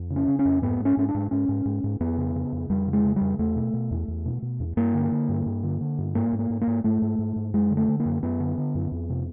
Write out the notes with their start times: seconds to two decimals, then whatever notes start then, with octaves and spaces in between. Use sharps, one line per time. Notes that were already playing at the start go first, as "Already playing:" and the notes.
Already playing: F2
0.10 C#3
0.16 C#4
0.28 C#3
0.39 C#4
0.45 F2
0.62 G#2 B3
0.80 G#2
0.85 C#4
0.97 G#2 C#4
1.09 D4
1.14 G#2
1.31 G#2 C#4
1.49 G#2
1.65 G#2
1.84 G#2
2.00 F2 B3
2.17 C#3
2.35 C#3
2.52 F2
2.70 F2 G3
2.87 C#3
2.93 G#3
3.04 C#3
3.16 F2 G3
3.39 E2 A3
3.56 B2
3.74 B2
3.91 E2
4.08 E2
4.25 B2
4.42 B2
4.60 E2
4.77 G2 A#3
4.94 D3
5.12 D3
5.29 G2
5.46 G2
5.63 D3
5.81 D3
5.98 G2
6.15 G#2 A#3
6.33 G#2
6.39 A#3
6.50 G#2
6.61 A#3
6.67 G#2
6.84 G#2 A3
7.02 G#2
7.19 G#2
7.36 G#2
7.54 F#2 G#3
7.71 D3
7.77 A3
7.88 D3
8.00 A#3
8.05 F#2
8.23 F#2 B3
8.40 D3
8.57 D3
8.75 F#2
8.92 F2
9.10 C3